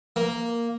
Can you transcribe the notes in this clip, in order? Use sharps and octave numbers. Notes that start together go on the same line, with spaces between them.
A#3